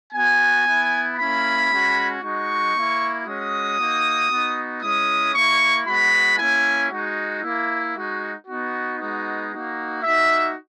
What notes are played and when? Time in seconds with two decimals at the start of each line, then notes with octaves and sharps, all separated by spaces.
0.14 B3 F#4 G#5
0.65 B3 E4
1.17 A#3 C#4 E4 B5
1.70 G#3 C#4 F#4
2.21 G#3 D#4 F#4 C#6
2.74 A#3 E4
3.25 G#3 C#4 F#4 D#6
3.79 A#3 D#4 F#4
4.31 B3 D#4 F#4
4.82 G#3 C#4 E4 D#6
5.34 A#3 E4 C#6
5.86 G#3 B3 F#4 B5
6.39 A#3 C#4 E4 G#5
6.90 G#3 D#4 F#4
7.43 A#3 E4
7.95 G#3 D#4 F#4
8.48 B3 D#4 F#4
8.99 G#3 B3 D#4 F#4
9.51 A#3 D#4 F#4
10.03 A#3 D#4 F#4 E5